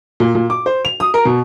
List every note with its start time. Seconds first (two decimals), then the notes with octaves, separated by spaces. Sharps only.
0.20 A#2
0.35 A#2
0.50 D6
0.66 C5
0.85 F7
1.00 D#6
1.14 A#4
1.25 B2